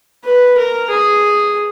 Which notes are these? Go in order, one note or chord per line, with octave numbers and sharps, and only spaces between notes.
B4
A#4
G#4